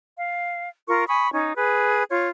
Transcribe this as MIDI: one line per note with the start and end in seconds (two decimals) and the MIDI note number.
0.16 0.69 77
0.87 1.03 65
0.87 1.03 70
0.87 1.03 85
1.08 1.27 80
1.08 1.27 83
1.08 1.27 85
1.08 1.27 87
1.32 1.52 61
1.32 1.52 63
1.55 2.03 68
1.55 2.03 71
2.09 2.27 65
2.09 2.27 73